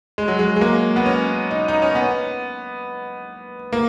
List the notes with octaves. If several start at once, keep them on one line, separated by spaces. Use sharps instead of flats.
G#3
F#3
G#3
G#3
A#3
B3
C#4
D#4
D#4
C#4
B3
A#3